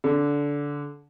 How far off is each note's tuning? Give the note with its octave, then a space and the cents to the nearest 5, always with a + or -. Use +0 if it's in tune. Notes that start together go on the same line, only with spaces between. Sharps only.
D3 -20